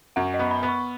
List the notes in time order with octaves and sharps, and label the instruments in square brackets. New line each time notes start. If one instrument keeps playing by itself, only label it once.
[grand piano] F#2 [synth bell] F#5
[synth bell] D#5
[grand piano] B3
[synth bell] B5
[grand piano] B3
[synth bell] C#6